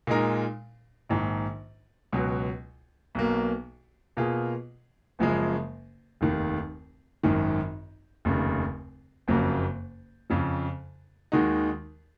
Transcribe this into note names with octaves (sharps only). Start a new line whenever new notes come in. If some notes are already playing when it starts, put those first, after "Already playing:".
A#2 G#3 D#4 A#4
A#1 G#2 D#3
C#2 B2 F#3
B1 B2 F#3 A#3
B2 A#3 F4 G#4
F#1 F#2 C#3 F3 G#3
F1 D#2 D#3
G#1 F#2 D#3
F1 D#2 C#3
F#1 F2 C#3 F#3 A#3
F2 C#3 F3
D#2 D#3 G#3 D#4 F#4